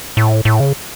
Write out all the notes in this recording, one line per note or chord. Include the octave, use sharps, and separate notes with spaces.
A2
A2
C#3